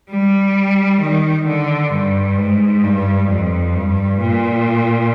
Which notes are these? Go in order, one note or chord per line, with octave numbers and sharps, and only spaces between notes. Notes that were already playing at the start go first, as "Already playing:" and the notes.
G3
D#3
D3
G2
G#2
G2
F2
G2
A#2